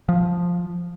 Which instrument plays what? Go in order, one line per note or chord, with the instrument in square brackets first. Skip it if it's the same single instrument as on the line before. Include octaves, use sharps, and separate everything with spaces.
[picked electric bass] F3